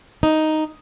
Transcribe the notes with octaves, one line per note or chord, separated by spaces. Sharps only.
D#4